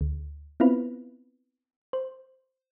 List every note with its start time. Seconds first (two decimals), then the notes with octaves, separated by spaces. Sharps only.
0.01 D2
0.60 B3 C4 E4 F4 B4
1.93 C5